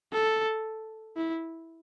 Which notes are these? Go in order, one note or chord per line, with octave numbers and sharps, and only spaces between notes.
A4
E4